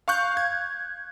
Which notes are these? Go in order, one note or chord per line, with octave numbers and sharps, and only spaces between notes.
F5 C#6 F#6 G6
G#6